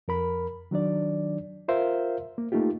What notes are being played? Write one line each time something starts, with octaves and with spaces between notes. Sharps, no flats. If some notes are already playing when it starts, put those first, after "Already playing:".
F2 A#4 B5
D#3 F#3 D4 D5
F4 A#4 C5 E5 F5
A#3
A3 A#3 D#4 F4 G4